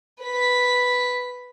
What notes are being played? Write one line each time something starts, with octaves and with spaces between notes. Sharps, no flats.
B4 B6